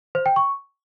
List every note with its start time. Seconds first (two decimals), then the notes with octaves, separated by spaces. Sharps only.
0.15 C5
0.26 G5
0.36 C#6